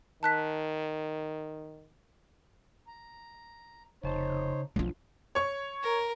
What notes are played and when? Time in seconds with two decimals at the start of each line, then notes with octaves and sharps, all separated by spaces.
0.23 D#3 A5 F#6 B6
2.87 A#5
4.03 F1 C#3 D#4 C5 C#5 A5
4.76 B1 F3 D4 F4
5.35 C#5 C#6
5.83 A#4